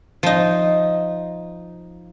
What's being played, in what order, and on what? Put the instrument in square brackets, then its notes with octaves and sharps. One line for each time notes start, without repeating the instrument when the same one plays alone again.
[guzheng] F3 D#4